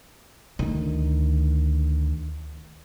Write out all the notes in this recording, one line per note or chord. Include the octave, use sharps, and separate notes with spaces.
D2 D#3